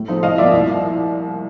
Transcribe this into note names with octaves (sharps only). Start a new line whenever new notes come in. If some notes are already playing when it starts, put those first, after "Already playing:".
Already playing: A2
F3 A3 C4 D#4
C2 D#5 F5
A#2 F3 A#3 D5 E5
C2